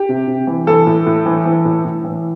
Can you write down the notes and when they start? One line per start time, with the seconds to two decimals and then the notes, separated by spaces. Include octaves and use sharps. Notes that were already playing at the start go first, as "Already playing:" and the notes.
Already playing: G4
0.09 C3
0.28 C3
0.47 E3
0.67 E3 A4
0.87 A2
1.07 A2
1.26 E3
1.45 E3
1.65 A2
1.85 A2
2.04 E3